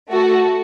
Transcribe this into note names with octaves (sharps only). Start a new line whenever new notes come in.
A3 F#4 A4